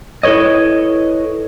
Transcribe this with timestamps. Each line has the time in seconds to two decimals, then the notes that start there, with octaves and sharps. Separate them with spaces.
0.23 E4 A4 B4 C#5 D#5